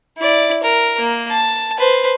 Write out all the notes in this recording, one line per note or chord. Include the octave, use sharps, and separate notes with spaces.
E4 D5
A#4
A#3
A5
B4 C5